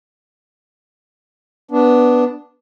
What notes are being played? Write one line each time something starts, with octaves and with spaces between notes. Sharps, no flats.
B3 D4